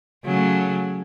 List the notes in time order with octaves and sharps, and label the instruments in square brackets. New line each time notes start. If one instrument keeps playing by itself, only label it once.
[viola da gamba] C#3 F#3 A3